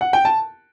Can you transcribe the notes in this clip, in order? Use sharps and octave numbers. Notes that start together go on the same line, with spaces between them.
F#5
G5
A5